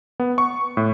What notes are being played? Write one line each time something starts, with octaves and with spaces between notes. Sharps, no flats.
B3
C#6
A2